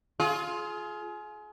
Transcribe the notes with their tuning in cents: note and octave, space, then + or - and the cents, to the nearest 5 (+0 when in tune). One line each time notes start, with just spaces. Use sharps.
F4 +0 G#4 +30